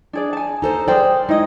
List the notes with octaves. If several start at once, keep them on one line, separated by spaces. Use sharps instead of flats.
D4 G#4 D5
G#5 A5
D#4 A4 C5
G#4 A#4 C5 D5 G5
G#3 D#4 E4 D#5